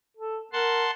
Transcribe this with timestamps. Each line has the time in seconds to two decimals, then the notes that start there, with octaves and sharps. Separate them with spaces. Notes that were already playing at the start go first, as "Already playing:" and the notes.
0.17 A4
0.53 A#4 F#5 A5 C6